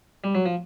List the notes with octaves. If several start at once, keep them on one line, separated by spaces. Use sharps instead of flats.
G3
F#3
F3